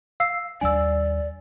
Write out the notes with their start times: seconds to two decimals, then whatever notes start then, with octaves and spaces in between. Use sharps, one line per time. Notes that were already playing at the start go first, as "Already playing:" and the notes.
0.20 F5 E6 C7
0.61 D#2 G3 D4 D5 G#5 E6